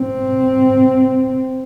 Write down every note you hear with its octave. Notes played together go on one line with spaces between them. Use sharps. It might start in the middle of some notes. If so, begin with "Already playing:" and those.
Already playing: C4